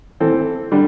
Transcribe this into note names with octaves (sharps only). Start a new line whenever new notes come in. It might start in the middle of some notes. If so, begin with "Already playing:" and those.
E3 C4 A4
D3 G3